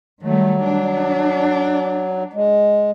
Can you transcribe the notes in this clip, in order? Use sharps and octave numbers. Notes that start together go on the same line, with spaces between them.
D#3 F#3 G3 A3
D4
G#3